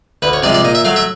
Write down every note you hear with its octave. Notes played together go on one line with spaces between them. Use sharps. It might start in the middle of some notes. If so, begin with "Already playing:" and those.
D2 B4
C#5
C3 F3 G#3 D5
D5
A#2 D#5
E5
F#3 A3 F5
E5